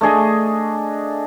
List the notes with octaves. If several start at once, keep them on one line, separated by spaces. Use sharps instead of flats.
A3 D4 G#4 D#5